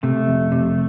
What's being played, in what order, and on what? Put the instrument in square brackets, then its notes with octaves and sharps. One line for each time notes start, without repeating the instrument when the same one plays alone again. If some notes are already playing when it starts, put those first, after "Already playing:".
[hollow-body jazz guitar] C3 [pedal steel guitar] A3
[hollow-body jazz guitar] F2
C3